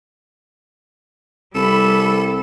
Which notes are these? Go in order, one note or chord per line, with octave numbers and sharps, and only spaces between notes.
C2 G3 A4 B5